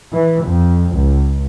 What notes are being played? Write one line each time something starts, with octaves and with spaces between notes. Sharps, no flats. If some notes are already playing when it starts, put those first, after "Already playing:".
E3
F2
C#2